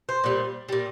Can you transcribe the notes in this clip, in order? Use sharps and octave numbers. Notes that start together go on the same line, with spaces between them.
C5
A#2 G3
A#2 G3